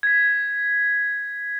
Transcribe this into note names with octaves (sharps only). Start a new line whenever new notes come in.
G#6 B6